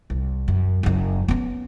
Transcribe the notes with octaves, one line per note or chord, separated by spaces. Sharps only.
C2
F#2
F#1 F#2
B3 C#4